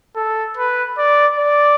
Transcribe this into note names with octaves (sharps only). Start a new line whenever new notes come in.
A4
B4
D5
D5